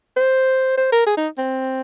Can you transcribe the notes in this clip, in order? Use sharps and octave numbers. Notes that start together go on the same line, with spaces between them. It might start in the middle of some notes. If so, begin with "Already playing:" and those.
C5
C5
A#4
G#4
D#4
C4